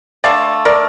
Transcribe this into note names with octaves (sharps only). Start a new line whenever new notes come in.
D3 A3 D5 F5
A#4 D5